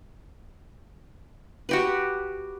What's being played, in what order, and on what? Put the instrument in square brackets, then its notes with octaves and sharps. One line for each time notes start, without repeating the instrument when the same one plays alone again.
[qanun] F#4 G4 B4